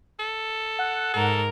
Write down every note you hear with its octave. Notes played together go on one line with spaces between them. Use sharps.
A4
F#5
G#2 A4 A#4